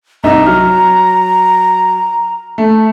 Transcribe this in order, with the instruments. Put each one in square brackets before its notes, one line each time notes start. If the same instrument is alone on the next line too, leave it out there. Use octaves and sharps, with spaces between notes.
[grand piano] C2 D#4 E5 [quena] A#5
[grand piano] F#3 F6
A3